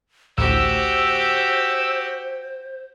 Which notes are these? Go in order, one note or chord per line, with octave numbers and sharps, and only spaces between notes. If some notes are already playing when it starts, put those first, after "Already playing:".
A1 D2 A2 F#4 G4 C5 E6